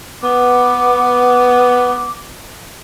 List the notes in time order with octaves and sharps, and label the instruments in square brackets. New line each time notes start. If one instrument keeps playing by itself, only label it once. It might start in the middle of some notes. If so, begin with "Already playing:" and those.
[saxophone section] B3 [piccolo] D6